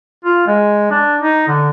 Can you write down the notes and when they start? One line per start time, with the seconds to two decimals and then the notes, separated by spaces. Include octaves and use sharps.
0.24 F4
0.47 G#3
0.91 D4
1.21 D#4
1.47 D3